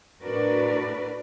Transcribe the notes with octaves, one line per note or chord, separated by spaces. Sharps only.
A2 D4 F#4 A#4 B4 D5